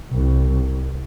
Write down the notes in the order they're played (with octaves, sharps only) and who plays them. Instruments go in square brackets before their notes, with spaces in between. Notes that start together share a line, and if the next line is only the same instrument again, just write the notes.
[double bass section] C2